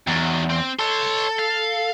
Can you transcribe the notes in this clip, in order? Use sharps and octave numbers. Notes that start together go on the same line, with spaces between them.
E2 D#3 F#3
C4
A4 C#5 C6
F5